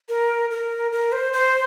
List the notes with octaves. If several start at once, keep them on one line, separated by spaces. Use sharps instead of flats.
A#4
A#4
A#4
C5
C5